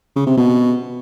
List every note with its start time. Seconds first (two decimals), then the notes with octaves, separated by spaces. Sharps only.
0.16 C#3
0.27 C3
0.37 B2